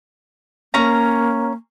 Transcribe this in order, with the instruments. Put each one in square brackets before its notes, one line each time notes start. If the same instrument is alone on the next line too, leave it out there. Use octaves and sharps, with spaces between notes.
[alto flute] A#3 [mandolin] C#4 A#5